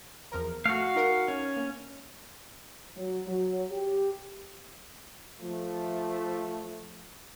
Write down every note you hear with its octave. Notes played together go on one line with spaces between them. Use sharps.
E2 F3 A#4
A3 F#4 F5
D#4 A#4
C#4
A#3
F#3
F#3
G4
F3 A3